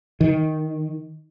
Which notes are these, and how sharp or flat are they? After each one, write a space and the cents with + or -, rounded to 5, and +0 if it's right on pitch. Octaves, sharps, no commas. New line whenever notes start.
D#3 +5